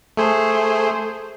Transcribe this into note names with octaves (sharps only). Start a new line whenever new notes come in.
A3 G#4 C5